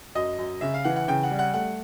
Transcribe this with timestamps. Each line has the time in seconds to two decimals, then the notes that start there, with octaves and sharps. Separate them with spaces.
0.15 F#2 D#5
0.38 F#2
0.61 C#3 E5
0.74 F5
0.84 E3 F#5
0.96 F#5
1.08 C#3 G5
1.23 F#5
1.31 G3
1.39 F#5
1.54 A3 F#5